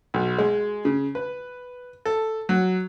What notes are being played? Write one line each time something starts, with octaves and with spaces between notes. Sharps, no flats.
B1
G#3
C#3
B4
A4
F#3